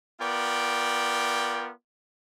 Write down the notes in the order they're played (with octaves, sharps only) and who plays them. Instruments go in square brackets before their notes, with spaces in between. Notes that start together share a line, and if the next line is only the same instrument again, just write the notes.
[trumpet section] B3 F4 A#4 D5 G5